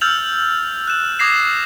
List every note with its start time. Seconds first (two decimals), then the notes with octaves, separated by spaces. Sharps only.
0.01 E6 F6 G6 A6 F7 F#7
0.88 F#6 E7
1.19 D6 D#6 G#6 A#6 C7 E7